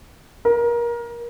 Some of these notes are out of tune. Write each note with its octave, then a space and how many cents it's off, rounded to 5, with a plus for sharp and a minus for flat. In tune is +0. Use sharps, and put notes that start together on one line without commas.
A#4 +25